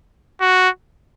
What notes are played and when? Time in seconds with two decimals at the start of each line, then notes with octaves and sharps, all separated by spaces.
0.41 F#4